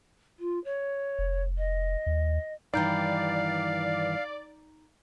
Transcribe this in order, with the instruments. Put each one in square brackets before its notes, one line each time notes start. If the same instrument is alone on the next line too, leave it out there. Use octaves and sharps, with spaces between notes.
[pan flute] F4
C#5
[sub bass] F1
[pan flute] D#5
[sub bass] D#2
[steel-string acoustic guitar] G2 D#3 E3 [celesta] D#4 A#5 G6 [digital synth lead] D5 [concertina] F5